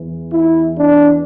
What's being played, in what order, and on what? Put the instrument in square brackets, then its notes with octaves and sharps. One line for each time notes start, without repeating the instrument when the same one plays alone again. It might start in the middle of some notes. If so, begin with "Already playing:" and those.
Already playing: [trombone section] E2 E3
E4
D4